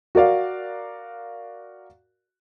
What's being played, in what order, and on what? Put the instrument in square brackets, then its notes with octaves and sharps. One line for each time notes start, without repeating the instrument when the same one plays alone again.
[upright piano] F#4 A#4 D5 F5